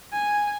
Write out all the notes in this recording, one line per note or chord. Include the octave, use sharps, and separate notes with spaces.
G#5